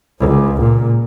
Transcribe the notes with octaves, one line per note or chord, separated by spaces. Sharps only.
C#2
A#2